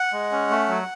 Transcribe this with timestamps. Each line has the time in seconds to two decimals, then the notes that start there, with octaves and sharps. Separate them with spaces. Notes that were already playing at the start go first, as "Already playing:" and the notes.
Already playing: F#5
0.13 G#3
0.32 C#4
0.50 A3
0.68 F#3